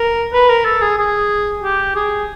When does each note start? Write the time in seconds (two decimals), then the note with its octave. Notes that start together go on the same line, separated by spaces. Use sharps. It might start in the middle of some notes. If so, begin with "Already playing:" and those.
Already playing: A#4
0.33 B4
0.49 A#4
0.65 A4
0.82 G#4
0.98 G#4
1.63 G4
1.96 G#4